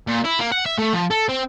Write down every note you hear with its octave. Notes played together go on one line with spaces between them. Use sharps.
A#2
E4
A#3
F#5
E5
A3
F3
A4
C4